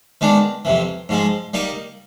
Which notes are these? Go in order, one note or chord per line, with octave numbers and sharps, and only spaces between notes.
D#3 G#3 B3 D4
F2 C3 E3
G#2 F3 G#3
G3 A#3 D#4